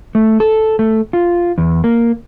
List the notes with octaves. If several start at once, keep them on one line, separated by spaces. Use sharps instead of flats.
A3
A4
A3
F4
E2
A#3